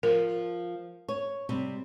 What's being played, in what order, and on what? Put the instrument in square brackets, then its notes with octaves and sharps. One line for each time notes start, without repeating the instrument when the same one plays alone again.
[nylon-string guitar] F3 [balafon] A#4
[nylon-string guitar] C#5
C3 G3